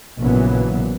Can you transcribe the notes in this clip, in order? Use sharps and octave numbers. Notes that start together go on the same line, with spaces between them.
A#1 A#2 C#3 E3 F#3 B3